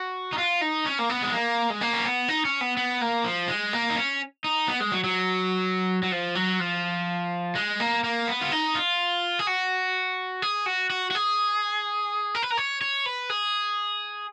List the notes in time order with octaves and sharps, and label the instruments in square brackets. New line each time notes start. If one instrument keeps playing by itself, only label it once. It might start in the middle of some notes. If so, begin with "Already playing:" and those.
Already playing: [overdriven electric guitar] F#4
D#4
F4
D#4
C#4
A#3
B3
G#3
A#3
G#3
A#3
C#4
B3
D#4
C#4
B3
B3
A#3
F3
G#3
A#3
D#4
C#4
D#4
B3
G#3
F#3
F#3
F#3
F3
F#3
F3
G#3
A#3
A#3
B3
F4
D#4
F4
G#4
F#4
G#4
F#4
F#4
F#4
G#4
A#4
B4
A#4
C#5
C#5
B4
G#4